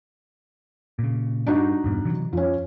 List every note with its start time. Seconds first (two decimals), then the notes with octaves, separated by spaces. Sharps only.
0.99 A#2 C#3
1.47 G2 D4 D#4 F#4
1.84 E1 G2 B2
2.05 C3 E3 F#3
2.33 F2 F3 C#4